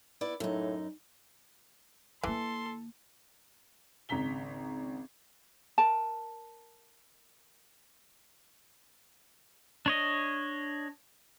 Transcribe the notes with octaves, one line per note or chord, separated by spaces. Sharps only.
B3 E4 D5
F#2 A2 D#4
D3 E3 A#3 A4 C6
G#1 C#2 A#5 B6 G7
A#4 A5
D4 C#5 D#5